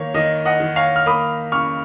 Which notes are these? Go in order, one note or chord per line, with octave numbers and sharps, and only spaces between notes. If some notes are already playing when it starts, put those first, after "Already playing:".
Already playing: D#3 A#3 C#5
D#3 D#5
D#5 F#5
D#3
C#5 F5
F6
A#3 B5 D#6
C#3 C#6 F6